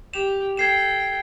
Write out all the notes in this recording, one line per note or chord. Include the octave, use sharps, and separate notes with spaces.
G4 E7 F7
A4 G5 G#6 C7 E7